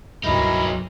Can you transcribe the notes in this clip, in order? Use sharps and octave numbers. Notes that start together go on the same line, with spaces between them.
C#2 G2 F#3 D#4 E4 A#4 D#5